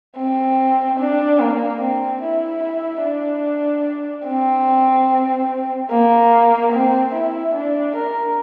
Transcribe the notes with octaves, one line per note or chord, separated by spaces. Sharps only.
C4
D4
A#3
C4
E4
E4
D4
C4
A#3
C4
E4
D4
A#4